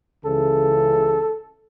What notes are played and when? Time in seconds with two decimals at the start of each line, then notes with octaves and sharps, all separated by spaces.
0.24 C#2 C#3 E3 A4